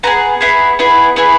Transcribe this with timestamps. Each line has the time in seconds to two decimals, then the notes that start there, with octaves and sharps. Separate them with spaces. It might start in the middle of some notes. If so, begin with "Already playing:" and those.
0.03 B3 E4 G#4 A#5
0.41 B3 E4 G#4
0.79 B3 E4 G#4
1.16 B3 E4 G#4